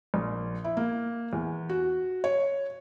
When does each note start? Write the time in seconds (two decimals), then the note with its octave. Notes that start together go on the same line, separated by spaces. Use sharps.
0.14 A#1
0.64 E4
0.77 A#3
1.33 E2
1.69 F#4
2.24 C#5